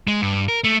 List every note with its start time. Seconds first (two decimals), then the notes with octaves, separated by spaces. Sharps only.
0.07 G#3
0.22 G2
0.49 A#4
0.64 A3